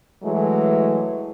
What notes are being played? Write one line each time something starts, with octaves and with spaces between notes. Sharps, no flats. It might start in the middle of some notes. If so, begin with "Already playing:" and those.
E3 F#3 G#3 A3